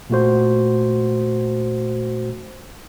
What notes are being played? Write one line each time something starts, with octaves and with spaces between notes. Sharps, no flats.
A#2 A3 F#4 C5